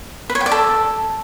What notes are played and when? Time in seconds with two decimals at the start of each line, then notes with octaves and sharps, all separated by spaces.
0.30 B4
0.35 C#5
0.41 G5
0.46 D5
0.51 A4